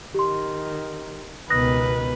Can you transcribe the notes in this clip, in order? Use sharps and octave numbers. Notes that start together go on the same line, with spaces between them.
D#3 G4 C6
C#2 B2 D#3 B4 D#6 F#6 A#6